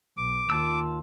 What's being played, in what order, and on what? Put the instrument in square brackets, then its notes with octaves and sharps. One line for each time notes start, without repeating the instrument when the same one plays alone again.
[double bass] B1 [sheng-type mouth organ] D6
[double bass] D#2 [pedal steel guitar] F4 A5 E6